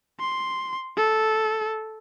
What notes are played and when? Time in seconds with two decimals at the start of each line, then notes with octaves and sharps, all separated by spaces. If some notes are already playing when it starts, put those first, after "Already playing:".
0.20 C6
0.97 A4